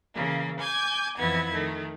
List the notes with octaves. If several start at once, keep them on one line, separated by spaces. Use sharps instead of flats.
C#3 E3 A#3
G#5 D6 G6 G#6
F2 E3 B3 E4 G#6
D#3 A3